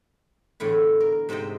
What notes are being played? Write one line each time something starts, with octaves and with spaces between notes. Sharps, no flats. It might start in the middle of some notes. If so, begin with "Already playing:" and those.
E2 A2 D3 E4
A#4
G#2 C3 C5 D#5 G5